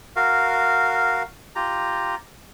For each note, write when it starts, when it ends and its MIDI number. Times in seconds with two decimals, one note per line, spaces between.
0.16 1.23 66
0.16 1.23 70
0.16 1.23 77
1.56 2.15 65
1.56 2.15 67
1.56 2.15 82